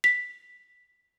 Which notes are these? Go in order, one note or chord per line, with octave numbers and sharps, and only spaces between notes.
B6